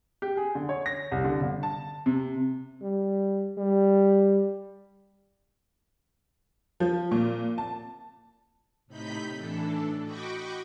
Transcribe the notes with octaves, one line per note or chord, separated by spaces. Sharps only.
G4
G#4
D3
C#5
A#6
C2
D3
G1
A5
C3
G3
G3
F3
A#2
A5
A2 C3 D#4 B5 G6 B6
A2 E3 D4 A4
F#4 D#5 G5 B5 C#6 D6